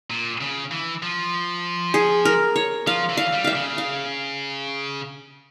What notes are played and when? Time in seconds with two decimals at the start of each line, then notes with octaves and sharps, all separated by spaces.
0.10 A#2
0.41 C#3
0.71 E3
1.03 F3
1.94 G#4
2.25 A#4
2.56 C#5
2.87 F3 F5
3.09 E3
3.17 F5
3.33 G3
3.44 E5 F5
3.55 C#3
3.78 F5